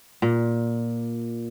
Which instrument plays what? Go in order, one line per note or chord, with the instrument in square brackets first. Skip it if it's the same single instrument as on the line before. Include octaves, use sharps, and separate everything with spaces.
[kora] A#2